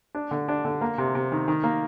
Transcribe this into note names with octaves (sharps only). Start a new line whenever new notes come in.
D4
D3
D4
D3
A#3
C3
C3
D#3
D#3
A#3